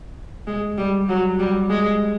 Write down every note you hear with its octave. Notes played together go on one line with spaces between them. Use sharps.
G#3
G3
F#3
G3
G#3